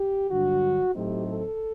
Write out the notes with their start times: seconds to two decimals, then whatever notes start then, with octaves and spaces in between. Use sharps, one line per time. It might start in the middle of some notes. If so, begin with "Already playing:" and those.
Already playing: G4
0.30 G2 D3 F#3 F#4
0.94 A2 F#3 A3 C4 D#4 G4
1.26 A4